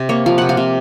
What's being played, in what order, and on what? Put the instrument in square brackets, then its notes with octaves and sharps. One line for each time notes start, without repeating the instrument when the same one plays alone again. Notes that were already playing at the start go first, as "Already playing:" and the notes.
Already playing: [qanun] C3
A#3 C#5
F3 F5
C3 F#5
F5
C3